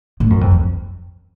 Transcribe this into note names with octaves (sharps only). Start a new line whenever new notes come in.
A2
F#2
F2
F2